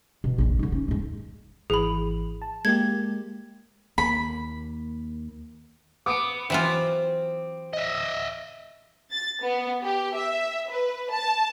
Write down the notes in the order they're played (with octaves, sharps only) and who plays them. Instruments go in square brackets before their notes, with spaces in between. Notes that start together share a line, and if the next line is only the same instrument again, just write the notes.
[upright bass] B2
A#1 F2
D3 D#4
C#4
D#2 G#2
[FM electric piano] G#1 E3 [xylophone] G#4 B5
[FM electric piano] A5
[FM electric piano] G#3 A#3 G4 [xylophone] G#6
[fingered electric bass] D#2 A#3 [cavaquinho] B5
[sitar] B3 [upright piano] D6 D#6 D7
[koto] E3 F#3 F4 [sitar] C4
[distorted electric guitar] D#5 E5
[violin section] A6
B3
G4
E5
B4
A5